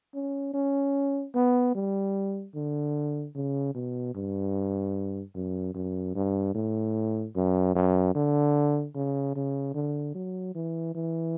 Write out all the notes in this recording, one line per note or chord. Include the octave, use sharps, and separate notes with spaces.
C#4
C#4
B3
G3
D3
C#3
B2
G2
F#2
F#2
G2
A2
F#2
F#2
D3
C#3
C#3
D3
F#3
E3
E3